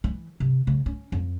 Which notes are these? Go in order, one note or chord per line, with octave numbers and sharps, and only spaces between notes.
E3
C3
C#3
C#4
F2